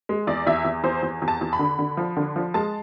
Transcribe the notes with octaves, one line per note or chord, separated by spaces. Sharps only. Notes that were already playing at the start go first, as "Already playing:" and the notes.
G#3
E2 D5
E2 E5
E2
E2 C5
E2
E2
A5
E2
B5
D3
D3
F3
D3
F3
G#3 A5